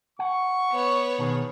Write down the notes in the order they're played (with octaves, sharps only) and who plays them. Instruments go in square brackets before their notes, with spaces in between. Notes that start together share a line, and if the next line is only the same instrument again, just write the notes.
[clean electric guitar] F#5 [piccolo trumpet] C#6
[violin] B3 C#5
[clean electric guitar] B2 D#3 G#4